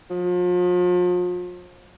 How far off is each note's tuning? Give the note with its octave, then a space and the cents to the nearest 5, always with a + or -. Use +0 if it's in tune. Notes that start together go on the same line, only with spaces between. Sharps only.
F3 +40